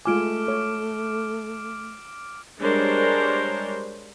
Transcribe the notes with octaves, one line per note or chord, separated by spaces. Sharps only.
G#3 A3 F4 G#5 D6 F6 D7
A4 C#5
G3 G#3 D4 A#4 C5 C#5